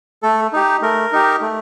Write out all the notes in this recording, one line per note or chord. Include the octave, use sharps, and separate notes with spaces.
A3 A4
D#4 G4
A3 A#4
D#4 G4
A3